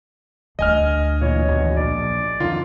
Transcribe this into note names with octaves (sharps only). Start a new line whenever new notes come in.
D2 D4 D#5 G#5 F6
A#2 E3 C#5
G#1 E2 B2
A#1 D5
F2 D3 D#3 F4